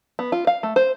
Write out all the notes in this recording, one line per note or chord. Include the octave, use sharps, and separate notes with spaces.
B3
F4
F5
A3
C5